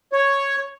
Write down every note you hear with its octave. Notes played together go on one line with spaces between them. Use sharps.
C#5